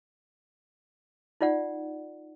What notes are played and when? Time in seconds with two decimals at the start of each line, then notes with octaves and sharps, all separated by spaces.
1.41 D#4 F4 D5 F#5